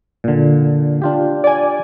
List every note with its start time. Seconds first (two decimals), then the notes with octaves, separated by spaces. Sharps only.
0.24 A#2 D3
1.02 D4 F4 G4
1.44 D5 G#5